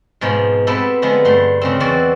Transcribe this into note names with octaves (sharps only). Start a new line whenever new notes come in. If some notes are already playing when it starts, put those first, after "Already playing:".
G#2 B2 F3 G#3
B3 C4 E4 G4 A4
D3 F3 G#3 B3
G2 A3 C6
C#3 G#3 C4
E2 E3 C4 F#4 D5 G#5